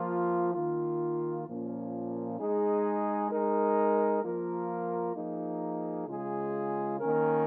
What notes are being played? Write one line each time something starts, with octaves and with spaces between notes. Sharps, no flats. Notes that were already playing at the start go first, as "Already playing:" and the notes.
Already playing: F3 A#3 F4
D#3 A#3 F4
A#2 F3 A#3 C#4
G#3 D#4 G#4
G#3 D#4 A#4
F3 A#3 F4 A#4
F3 A#3 D#4 G#4
C#3 G#3 F4 G#4
D#3 A#3 C#4 A#4